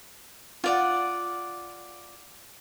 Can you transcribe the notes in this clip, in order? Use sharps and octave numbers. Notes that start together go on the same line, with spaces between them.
F4 D5 F#5